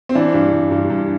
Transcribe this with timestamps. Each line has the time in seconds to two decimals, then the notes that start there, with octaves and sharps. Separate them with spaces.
0.09 C4
0.15 E3 D4
0.34 G2
0.53 G2
0.71 G2
0.90 G2